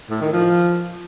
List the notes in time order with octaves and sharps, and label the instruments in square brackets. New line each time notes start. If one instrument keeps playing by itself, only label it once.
[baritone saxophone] A2
D#3
F3